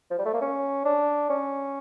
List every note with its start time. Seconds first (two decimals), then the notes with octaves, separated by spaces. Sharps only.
0.11 F3
0.18 G3
0.25 A3
0.34 A#3
0.41 C#4
0.85 D4
1.30 C#4